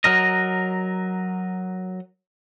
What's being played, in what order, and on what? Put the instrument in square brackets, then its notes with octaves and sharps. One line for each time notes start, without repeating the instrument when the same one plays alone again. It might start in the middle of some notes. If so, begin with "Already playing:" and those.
[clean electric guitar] F#3 A#4 D#5